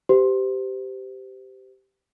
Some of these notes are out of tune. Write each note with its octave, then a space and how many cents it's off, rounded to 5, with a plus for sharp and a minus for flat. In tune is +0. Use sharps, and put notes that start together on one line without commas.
G4 -10 C5 -35